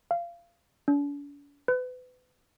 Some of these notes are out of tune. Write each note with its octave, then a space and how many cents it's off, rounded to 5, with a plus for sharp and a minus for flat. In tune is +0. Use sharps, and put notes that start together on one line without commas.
F5 -25
D4 -45
B4 +35